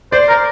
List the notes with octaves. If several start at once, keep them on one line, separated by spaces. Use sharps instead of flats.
C5 D5
A#4